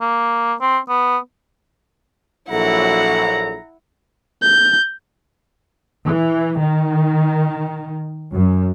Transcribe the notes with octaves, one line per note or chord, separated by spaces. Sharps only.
A#3
C4
B3
A#1 F#3 E4 A4 F#5 A#5
G6
E3
D#3
F#2